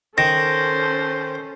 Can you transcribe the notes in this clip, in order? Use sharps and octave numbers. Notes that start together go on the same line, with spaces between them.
D#3 C#4 A4 C5 A#6